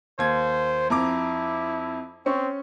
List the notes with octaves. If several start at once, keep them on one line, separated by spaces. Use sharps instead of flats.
D#2 C5 G#6
F2 E4 A#5 D6
C4 C#4 C#6